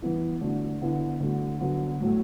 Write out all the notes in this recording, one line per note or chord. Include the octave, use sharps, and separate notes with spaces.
E3 B3 E4
D3 A3 D4 F#4
D3 B3 E4
D3 A3 F#4
D3 F#3 B3
A2 F#3 A3